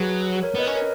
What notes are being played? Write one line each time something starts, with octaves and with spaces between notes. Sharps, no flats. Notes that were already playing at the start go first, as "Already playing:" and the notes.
Already playing: F#3 G#4 B4
A#4 C#5
B3 B4 D#5
C#4
A#4 C#5